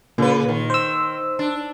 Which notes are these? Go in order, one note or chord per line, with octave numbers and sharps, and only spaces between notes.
A#2 C#3 B4
D#3
C5 E6
D4